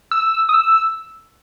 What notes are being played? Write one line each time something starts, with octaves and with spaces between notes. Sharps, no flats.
E6
D#6
E6